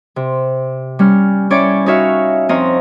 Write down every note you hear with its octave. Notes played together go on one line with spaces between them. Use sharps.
C3
G3 C#4 F6
C#4 E4 C#5 D5 G5 D6
D#4 F#4 C#5 E5 F5
F2 C4 C#5 D#5 F5 A#5